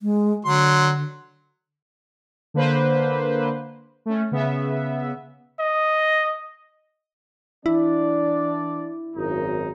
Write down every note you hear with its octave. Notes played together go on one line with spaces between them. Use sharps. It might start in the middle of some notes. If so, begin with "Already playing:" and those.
G#3
D3 F#3 C6
D3 A#3 B4 C5
A3 C#4
C#3 B3 E5
D#5
E3 D4 E4 D5
G#1 F#2 D#4